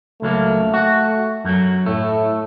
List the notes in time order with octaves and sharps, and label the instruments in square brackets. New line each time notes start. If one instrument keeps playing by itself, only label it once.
[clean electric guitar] C#2 F#3 A#3 [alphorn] A3
[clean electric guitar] F#4
F#2 F#3
[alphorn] A2 [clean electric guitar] A3